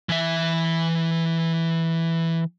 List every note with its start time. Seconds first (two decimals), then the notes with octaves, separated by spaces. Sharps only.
0.09 E3 E5